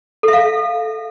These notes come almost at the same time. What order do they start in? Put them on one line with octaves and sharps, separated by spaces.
A4 E5 F5